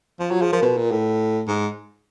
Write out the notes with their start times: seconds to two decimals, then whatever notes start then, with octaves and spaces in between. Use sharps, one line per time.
0.20 F3
0.31 F#3 F4
0.41 F3 G#4
0.52 F3 A#4
0.62 B2 B4
0.77 A#2
0.91 A2
1.48 G#2